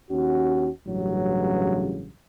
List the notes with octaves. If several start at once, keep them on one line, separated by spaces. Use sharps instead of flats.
D#2 C#4 F#4
A1 G2 C#3 E3 F#3